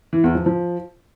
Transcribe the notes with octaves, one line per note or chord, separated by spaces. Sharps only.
E3
E2
F3
F3